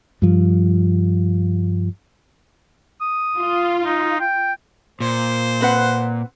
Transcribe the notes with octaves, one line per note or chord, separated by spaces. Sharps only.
G2 F3
D#6
F4
D#4
G5
A#2 C5
C4 B4 F#5